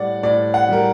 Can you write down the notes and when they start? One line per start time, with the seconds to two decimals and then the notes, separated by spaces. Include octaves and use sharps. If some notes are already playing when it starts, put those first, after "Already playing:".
Already playing: A2 G3 D5 F#5
0.23 A2 D5
0.54 F#5
0.69 G3 A#4